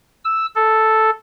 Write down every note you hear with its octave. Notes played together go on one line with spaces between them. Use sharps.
E6
A4